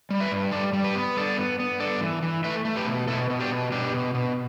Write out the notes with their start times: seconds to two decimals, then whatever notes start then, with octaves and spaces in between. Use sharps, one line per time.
0.10 G3
0.20 B4 E5
0.31 G2
0.52 G3 A4 D5
0.73 G3
0.84 G4 B4
0.95 B3
1.17 G2 A4 D5
1.38 B3
1.60 B3
1.80 G2 A4 D5
2.02 E3
2.23 E3
2.44 A3 B4 E5
2.65 A3
2.76 G4 B4
2.87 B2
3.08 B2 E4 A4
3.30 B2
3.40 D4 G4
3.50 B2
3.72 B2 D4 G4
3.94 B2
4.15 B2